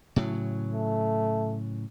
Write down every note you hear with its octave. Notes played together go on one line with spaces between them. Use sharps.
A2 C#3 F#3
A3